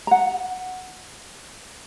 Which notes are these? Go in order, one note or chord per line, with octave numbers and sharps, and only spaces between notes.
F#5 A#5